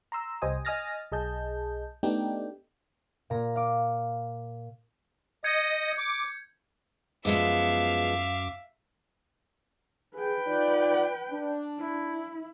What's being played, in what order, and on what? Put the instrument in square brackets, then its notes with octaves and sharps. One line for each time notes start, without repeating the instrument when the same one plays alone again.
[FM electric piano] A#5 C6 E6
C2 G4 C5 D#5 G#5 D#6
D#5 G#5 D#6 F6 A6 A#6
B1 G#4 D#5 A5 G6
A3 B3 D4 D#4 G4 G5
[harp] A#2 A#5
F5 D6
[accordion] D#5 D#6 [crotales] G6 G#6 C#7
[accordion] D6
[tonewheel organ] F#2 D6 [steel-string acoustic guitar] F3 G#3 B3 [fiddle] E5 F5
[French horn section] G#4 [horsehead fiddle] B4 G5
[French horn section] D#4 F4 D5
D4
[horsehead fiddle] E4